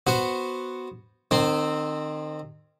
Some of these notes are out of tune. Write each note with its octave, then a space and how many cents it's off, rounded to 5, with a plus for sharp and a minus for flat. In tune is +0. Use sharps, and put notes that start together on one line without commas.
B3 +0 F#4 +0 C5 +5
D#3 -30 C4 +0 C6 +0